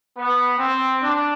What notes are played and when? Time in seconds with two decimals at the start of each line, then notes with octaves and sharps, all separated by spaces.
0.17 B3
0.59 C4
1.02 D4